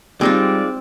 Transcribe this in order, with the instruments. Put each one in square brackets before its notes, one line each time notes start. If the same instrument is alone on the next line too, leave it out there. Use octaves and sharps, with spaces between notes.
[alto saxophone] G3 [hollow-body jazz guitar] G#3 D#4 F4 [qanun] C4 [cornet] D5